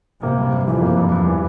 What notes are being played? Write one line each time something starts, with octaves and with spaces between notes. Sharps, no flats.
C3 A#3
G2
G2
F2 E3
A#3
G2
E2 G2
E3